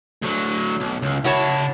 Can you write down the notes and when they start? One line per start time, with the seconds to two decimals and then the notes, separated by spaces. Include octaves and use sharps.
0.22 D2 F#3
0.80 B1
1.02 C#2
1.24 C#3 E4 F#4 C#5 A5